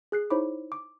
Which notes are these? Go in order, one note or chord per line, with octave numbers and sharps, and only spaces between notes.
G#4 F#6 C7
D#4 E4 C5 C#5 B5 D6
D6